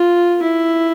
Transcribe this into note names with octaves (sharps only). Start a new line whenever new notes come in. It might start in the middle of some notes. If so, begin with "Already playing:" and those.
Already playing: F4
E4